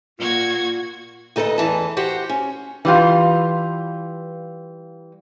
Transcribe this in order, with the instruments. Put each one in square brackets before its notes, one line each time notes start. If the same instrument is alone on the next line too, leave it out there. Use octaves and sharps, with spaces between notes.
[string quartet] A#2 F#4 G#6 [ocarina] F4
[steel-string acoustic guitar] D2 D#4 A4 B4 D#5
E2 E3 A5
F#4 G4 C5 F#5
C#4
[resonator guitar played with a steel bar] E3 G3 F4